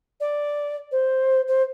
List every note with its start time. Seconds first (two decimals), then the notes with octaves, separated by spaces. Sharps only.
0.20 D5
0.91 C5
1.48 C5